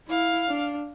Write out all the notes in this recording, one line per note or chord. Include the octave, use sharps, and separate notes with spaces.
E4 F5
D4